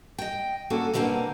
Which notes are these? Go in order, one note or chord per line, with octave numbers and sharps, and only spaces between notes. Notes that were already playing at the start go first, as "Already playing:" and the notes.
D#5 G5
G3 A#3 C#4 F#4 A4
B2 D3 G3 A#3 C4 C#4